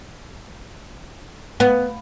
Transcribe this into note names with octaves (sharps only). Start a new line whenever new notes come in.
B3